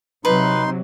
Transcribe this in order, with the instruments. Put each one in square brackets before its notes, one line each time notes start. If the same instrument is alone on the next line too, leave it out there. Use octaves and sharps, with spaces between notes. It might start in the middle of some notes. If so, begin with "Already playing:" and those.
[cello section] C3 F#3 [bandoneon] D#4 C6 [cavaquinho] B4